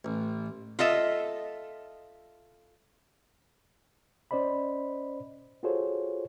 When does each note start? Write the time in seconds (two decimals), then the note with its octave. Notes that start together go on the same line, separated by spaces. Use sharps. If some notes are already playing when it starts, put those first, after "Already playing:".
0.05 A1
0.79 F4 A4 D#5 E5
4.31 C#4 C5 D5 D#5 B5
5.63 F4 F#4 G#4 A4 C5 C#5